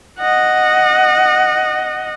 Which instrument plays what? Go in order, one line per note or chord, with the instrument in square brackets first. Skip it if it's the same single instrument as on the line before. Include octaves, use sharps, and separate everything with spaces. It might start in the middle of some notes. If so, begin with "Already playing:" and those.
[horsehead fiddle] D#5 F#5